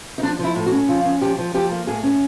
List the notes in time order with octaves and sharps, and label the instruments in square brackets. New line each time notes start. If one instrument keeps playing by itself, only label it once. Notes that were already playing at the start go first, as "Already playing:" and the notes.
[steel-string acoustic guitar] D#4
F3 D4
F3 E4
A2
F#4
C#4
F3 F4
C#4
F3 G4
F3
F3 G4
A#3
A2 G#4
C#4